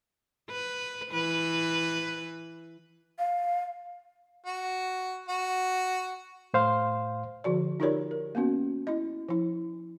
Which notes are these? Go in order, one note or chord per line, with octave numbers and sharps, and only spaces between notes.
B4
E3 B4
F5
F#4
F#4
A2 C5 F5 C6
D3 F3 F#4 D5
D#4 F4 G4 A#4 C#5 D5
A#4
A#3 B3 C#4 F#4
E4 D#5
F3 E4